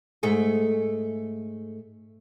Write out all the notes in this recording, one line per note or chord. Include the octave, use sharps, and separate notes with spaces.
G#2 A3 G#4